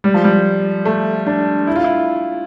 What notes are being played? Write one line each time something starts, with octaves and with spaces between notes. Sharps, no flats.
G3
F3
G3
A3
D4
E4
F4
E4